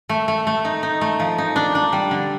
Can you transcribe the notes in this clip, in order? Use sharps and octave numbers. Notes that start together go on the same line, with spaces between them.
A3
A3
A3
D#4
D#4
A3
F3
D#4
D4
D4
G3
D3